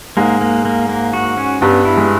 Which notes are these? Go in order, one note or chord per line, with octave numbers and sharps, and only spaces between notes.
G#2 G#3 A#3
A#3
A#3
A#3
F#4
C#4
G2 G3 B3
E4
G#3